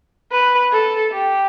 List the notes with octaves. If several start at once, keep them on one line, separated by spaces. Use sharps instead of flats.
B4
A4
G4